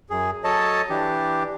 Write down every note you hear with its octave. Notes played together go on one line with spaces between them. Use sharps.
F#2 G#4
F#3 A4 C#5 D#5 A5
E3 D4 G4